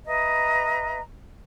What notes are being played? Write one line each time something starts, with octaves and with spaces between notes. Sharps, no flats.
B4 D#5 E5 A#5